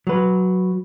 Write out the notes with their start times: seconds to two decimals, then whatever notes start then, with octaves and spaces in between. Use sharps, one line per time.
0.07 F#3 B4